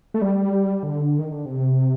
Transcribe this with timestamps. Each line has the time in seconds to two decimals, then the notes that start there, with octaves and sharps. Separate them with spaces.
0.14 A3
0.22 G3
0.83 D3
1.19 D#3
1.32 D3
1.46 C3